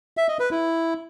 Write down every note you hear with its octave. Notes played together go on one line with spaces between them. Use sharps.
E5
D#5
B4
E4